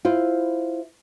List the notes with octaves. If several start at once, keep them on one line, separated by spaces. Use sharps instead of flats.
E4 F4 C5